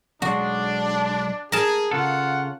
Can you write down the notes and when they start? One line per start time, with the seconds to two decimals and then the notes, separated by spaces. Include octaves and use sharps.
0.22 B1 G#3 D4 F#4
1.52 G#4 A#4 A5
1.91 C#3 F4 A4 F#5